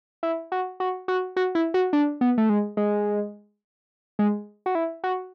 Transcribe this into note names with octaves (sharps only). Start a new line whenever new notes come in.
E4
F#4
F#4
F#4
F#4
E4
F#4
D4
B3
A3
G#3
G#3
G#3
F#4
E4
F#4